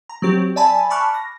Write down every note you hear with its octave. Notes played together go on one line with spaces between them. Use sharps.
A#5
F#3 C4 G4
D5 E5 G#5 A5 B5
A5 B5 C#6 D6 F6 F#6
A#6